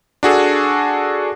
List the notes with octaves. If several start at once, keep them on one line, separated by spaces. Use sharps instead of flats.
D4 F#4 G#4 A4